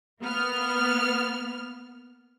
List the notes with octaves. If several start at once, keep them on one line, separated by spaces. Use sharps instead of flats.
A#3 B3 F6